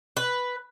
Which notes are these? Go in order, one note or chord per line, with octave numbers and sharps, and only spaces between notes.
B4